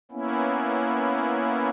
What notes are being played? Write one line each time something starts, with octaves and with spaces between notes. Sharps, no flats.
A#3 B3 C#4 E4